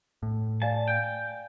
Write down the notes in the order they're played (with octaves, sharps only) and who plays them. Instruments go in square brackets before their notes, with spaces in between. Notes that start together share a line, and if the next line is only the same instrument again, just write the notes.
[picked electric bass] A2
[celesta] D5 F5 G#5 [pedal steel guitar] A5
[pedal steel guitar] G5